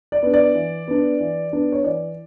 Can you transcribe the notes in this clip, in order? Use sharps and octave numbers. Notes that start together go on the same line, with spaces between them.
D5
B3 D4
D5
E3
B3 D4
E3
B3 D4
C#5
E3 D5